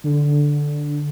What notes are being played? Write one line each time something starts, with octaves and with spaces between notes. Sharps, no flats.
D3